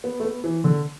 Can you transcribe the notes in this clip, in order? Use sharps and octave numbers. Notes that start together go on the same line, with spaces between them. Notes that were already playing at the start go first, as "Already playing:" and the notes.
B3
A3
B3
E3
D3